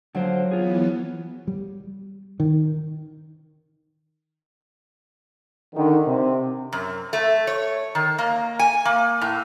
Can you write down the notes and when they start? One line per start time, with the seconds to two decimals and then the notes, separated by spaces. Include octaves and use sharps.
0.15 D3 F3 F#3 C5
0.52 E3 B3 F4 G#4
1.47 G3
2.40 D#3
5.75 D3 D#3
6.06 C3
6.73 F#2
7.13 A3
7.47 C#5
7.95 D#3
8.18 A#3
8.59 G#5
8.85 A#3
9.21 A2